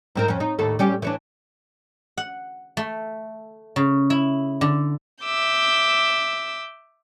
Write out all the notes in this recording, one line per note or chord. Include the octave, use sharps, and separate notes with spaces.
G#2 C4 A#4
F2 C#4
D#4
D#2 A2 A4
G3 C#4 G4
E3 C#4 D4
F#5
A3
C#3
E4
D3
E5 D6 E6 G6